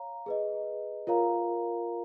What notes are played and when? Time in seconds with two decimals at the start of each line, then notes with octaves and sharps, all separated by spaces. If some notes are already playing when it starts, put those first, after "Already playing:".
Already playing: C#5 F5 A#5
0.26 G#4 B4 D#5
1.07 F4 A#4 C#5 F5 A#5